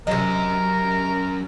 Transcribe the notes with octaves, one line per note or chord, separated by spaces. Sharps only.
F#2 C3 A#4 D#5